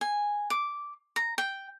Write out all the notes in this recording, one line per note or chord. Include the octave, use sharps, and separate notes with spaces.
G#5
D6
A#5
G5